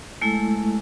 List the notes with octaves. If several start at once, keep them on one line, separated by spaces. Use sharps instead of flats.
G#3 A3 E4 A4